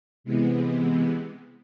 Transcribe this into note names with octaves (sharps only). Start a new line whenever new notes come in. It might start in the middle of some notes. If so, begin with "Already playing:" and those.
C3 E3 G#3 B3